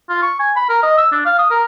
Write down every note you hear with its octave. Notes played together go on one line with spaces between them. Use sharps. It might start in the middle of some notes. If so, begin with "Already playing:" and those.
F4
C#6
G#5
B5
A#4
D#5
E6
D4
F5
D#6
A#4